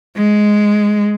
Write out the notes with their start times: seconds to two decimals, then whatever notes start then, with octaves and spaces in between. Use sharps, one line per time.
0.17 G#3